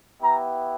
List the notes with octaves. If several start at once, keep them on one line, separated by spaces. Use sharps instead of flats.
B3 E4 G4 A#5